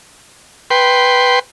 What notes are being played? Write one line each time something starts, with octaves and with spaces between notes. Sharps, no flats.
B4 G5 C6